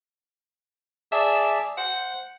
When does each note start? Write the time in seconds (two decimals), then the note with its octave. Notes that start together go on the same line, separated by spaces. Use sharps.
1.12 G#4 D5 E5 A5
1.77 C5 F#5